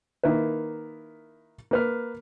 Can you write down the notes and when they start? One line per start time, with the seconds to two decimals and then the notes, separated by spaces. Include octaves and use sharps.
0.23 D#3 A#3 E4 B4
1.71 A#3 B4 F6